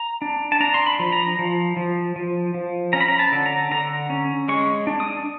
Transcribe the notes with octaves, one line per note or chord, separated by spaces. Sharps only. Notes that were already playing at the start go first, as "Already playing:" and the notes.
Already playing: A#5
D4
A5
D4 A#5
C6
B5
F3
A#5
F3
F3
F3
F3
C#4 A#5
B5
A#5
A5
D3
A#5
D3 A#5
C#4
G#3 C#6
D4
D#6